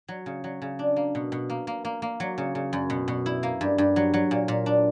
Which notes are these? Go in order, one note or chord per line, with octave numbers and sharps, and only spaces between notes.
F#3
C#3
F#3
C#3
D4
A#3
B2
B2
A#3
A#3
A#3
A#3
F#3
C#3
C#3
F#2
B2
B2
E4
A#3
G2
G2
F#3
F#3
A#2
A#2
D4